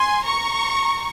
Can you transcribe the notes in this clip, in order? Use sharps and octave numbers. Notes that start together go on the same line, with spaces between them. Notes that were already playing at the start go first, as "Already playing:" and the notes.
Already playing: G#5 C6
A#5 C#6